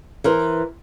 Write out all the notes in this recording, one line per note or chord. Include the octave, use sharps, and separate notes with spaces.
E3 A#4 C5